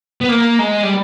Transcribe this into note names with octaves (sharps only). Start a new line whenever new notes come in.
B3
A#3
G#3
G3